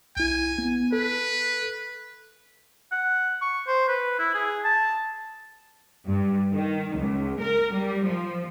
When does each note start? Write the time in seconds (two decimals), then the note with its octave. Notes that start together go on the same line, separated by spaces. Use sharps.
0.17 B1 E4 G#5
0.58 B3
0.93 A4 B4
2.92 F#5
3.42 C#6
3.67 C5
3.88 B4
4.19 E4
4.34 G#4
4.65 A5
6.07 G2
6.52 D#3
6.98 C#2
7.41 A#4
7.74 G3
8.06 F3